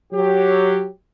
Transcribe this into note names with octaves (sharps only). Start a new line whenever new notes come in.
F#3 G4